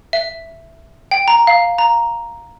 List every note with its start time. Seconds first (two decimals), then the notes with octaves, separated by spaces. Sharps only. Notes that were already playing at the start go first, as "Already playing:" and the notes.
0.13 E5
1.11 G5
1.28 A#5
1.47 F5
1.78 A#5